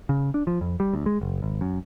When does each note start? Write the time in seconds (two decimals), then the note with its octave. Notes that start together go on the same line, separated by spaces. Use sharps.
0.09 C#3
0.34 D4
0.47 F3
0.61 F2
0.80 G3
0.94 D2
1.06 G#3
1.21 F#1
1.42 G#1
1.61 F#2